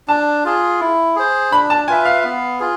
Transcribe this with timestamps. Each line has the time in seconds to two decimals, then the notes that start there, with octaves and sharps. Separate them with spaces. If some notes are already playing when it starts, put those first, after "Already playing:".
0.08 D4 A5
0.45 F4 G#4
0.80 E4
1.16 G#4 C5
1.52 D4 B5
1.70 A5
1.88 F4 B4 E5 G#5
2.05 F5
2.24 B3
2.60 F4 G#4